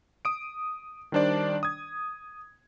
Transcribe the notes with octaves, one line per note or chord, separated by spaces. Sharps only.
D#6 D7
D#3 G3 D4 C5 D5
D#6 G#6